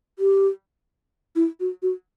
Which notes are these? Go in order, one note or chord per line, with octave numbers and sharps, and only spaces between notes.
G4
E4
F#4
F#4